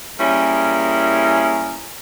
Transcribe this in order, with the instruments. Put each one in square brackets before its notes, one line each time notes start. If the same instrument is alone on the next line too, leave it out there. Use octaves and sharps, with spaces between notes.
[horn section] G3 A#3 C#4 E4 G#4 A#4